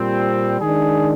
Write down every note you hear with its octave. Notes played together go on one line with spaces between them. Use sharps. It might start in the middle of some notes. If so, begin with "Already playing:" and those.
Already playing: A#2 G3 C4
D#3 G#3 D4 G#4